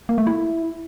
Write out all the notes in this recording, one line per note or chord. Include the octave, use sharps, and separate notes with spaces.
A#3
A3
E4